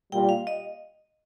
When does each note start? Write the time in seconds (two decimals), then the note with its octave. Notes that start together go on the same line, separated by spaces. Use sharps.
0.12 A#2 G3 A#3 G5
0.29 F5
0.47 D#5